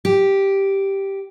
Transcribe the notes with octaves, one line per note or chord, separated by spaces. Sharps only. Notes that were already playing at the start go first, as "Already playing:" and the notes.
G4